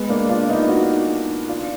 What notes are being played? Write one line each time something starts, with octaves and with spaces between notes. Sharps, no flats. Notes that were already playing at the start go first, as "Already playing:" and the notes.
Already playing: G#3 B3
A#3 D4
D4 F4
B3 D#4
D#4 F#4
D4 F4